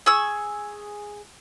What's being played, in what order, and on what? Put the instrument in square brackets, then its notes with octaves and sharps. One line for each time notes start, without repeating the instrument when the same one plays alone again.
[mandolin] G#4 C#6 E6